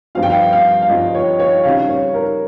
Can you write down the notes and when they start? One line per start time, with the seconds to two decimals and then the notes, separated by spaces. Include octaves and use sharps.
0.15 G2 F3 C4 F4 F5
0.23 G5
0.30 F5
0.53 F5
0.82 F5
0.89 G2 F3 C4 F4 D#5
1.15 C#5
1.40 C#5
1.63 C#3 G3 C4 D#4 F5
1.89 C#5
2.14 A#4